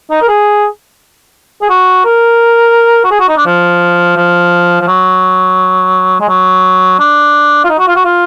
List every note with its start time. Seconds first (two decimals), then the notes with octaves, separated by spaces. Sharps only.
0.11 D#4
0.22 A#4
0.29 G#4
1.62 G#4
1.70 F#4
2.05 A#4
3.04 F#4
3.11 G#4
3.20 F#4
3.28 D#4
3.37 D4
3.46 F3
4.17 F3
4.81 F3
4.88 F#3
6.20 G#3
6.29 F#3
7.00 D4
7.64 F4
7.70 D#4
7.79 F#4
7.88 F4
7.96 F#4
8.05 F4